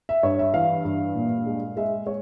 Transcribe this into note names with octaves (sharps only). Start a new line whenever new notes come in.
E5
G2 C#5
E5
E3 F5
G2
A#2
G#3
G#3 E5
G#3 C#5